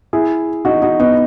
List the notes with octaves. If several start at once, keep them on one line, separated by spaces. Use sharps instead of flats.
E4 G#4
D#4 F#4
D#4 F#4
B3 D#4